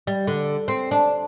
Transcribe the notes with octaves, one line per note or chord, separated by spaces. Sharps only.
G3
D3
C4
D4